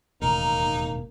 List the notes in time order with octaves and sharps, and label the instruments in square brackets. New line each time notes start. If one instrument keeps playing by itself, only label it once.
[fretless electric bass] E1 A1 D#2 [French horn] A#3 [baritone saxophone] D#4 [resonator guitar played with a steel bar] A#4